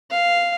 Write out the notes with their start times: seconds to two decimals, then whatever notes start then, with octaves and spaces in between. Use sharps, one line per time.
0.11 F5